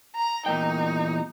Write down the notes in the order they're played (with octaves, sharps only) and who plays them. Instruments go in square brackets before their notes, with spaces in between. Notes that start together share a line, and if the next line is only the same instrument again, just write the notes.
[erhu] A#5
[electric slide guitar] E2 A#2 G5 [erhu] D#4